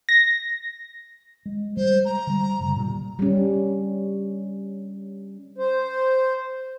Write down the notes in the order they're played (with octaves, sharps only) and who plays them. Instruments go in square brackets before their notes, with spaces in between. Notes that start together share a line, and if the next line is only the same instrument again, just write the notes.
[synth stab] A#6
[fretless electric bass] G#3
[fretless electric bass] G3 G#3 [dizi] C5
[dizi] A#5
[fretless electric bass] D3 G3
F#2 C#3 G3
A#2 D3 G3
[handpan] G3 C#4
[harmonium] C5